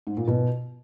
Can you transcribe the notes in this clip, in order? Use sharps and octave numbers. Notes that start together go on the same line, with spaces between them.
G#2
A#2
B2